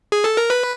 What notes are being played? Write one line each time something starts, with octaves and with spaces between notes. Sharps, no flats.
G#4
A4
A#4
B4